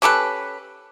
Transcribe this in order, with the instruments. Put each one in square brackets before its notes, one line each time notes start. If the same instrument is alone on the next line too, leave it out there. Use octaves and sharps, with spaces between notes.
[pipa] C#4 G4 A4 B4